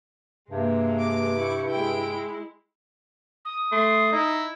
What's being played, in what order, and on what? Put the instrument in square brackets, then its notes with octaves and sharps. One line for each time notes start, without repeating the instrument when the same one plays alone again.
[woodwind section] G2 C3 [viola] G#3 A#3
[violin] D6
[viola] E4 C#6
[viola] G#3 E4 [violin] G5 D7
[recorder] D#6
[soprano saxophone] A3 [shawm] C6
[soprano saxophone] D#4 [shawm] E4